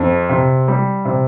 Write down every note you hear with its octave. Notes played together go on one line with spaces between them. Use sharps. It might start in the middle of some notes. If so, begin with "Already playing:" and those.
Already playing: F2
C3
G3
C3